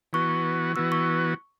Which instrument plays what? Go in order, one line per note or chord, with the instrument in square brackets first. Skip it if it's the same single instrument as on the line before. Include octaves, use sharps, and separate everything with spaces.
[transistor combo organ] E3 B3 F#4 [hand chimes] C#6
[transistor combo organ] E3 B3 F#4 [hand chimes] E6
[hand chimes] C#6